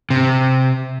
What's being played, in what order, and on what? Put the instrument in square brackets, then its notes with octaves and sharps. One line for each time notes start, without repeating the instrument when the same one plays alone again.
[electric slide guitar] C3